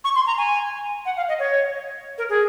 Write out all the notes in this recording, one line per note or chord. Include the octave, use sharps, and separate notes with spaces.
C#6
C6
A#5
G#5
F#5
F5
D#5
C#5
A#4
G#4